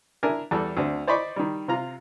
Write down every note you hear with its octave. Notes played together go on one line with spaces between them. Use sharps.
D4 E4 A#4 G#5
E2 G3 A4
D2 D3 C4
C5 D5 D#5 B5 C#6 D6
D#3 G3
C3 F4 A#5